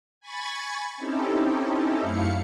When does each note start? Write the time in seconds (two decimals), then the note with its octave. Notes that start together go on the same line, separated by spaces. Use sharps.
0.20 G#5 B5 C#6 G#6 A6
0.97 C4 C#4 D#4 E4 G4 A4
2.01 F#2 A3 E4 F5 C#7